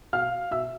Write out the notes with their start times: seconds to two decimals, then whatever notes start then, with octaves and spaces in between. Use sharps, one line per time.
0.13 B2 F5 F6
0.51 B2 E5 E6